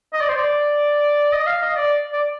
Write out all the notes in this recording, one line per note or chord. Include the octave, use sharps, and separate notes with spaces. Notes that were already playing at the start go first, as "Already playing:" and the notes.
D#5
D5
C5
D5
D#5
F5
D#5
D5
D5